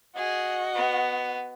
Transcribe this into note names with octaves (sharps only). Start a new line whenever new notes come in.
F#4 G#4 D#5
B3